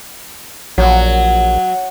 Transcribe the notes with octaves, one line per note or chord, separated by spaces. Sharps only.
A#1 F#3